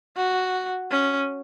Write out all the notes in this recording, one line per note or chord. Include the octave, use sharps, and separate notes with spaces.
F#4
C#4